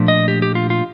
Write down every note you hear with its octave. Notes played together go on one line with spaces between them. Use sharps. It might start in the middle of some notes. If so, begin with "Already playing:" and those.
Already playing: A#2 F3 A3 D4
D#5
G4
G4
F4
F4